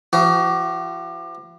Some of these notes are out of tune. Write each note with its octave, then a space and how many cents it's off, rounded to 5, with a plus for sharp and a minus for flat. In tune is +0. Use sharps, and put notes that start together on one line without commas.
F3 -45 F#4 +40